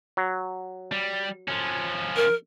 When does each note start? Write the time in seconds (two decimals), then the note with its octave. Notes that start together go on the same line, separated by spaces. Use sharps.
0.17 F#3
0.92 G3
1.48 F3 C#4
2.16 A#4